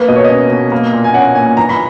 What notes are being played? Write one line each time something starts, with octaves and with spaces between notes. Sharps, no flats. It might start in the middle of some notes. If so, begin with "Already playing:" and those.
Already playing: A#3 B4
B2 D#5
C#5
C#4 D#5
B2
A#3
A#2
G#5
C#4 F#5
A#2 G#5
E3 A#5
B5